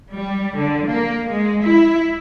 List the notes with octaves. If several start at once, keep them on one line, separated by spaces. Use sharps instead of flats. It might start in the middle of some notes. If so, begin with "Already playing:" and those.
G3
D3
A#3
G#3
E4